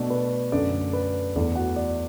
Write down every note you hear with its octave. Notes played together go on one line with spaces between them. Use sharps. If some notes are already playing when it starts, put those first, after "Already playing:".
Already playing: B2 A3 D4
B4
F#2 D3 A3 D4 D5
B4
E2 E3 A3 D4 D5
F#4 F#5
D5